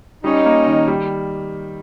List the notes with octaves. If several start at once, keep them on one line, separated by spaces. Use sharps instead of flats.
G3 C#4 D#4
A#3
D#3
G3